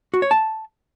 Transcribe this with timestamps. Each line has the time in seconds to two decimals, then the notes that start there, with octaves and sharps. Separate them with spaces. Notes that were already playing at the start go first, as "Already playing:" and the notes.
0.14 F#4
0.22 C#5
0.31 A5